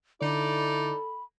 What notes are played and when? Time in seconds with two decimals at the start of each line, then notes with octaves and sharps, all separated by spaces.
0.22 D3 D#4 E4 A4 D5 B5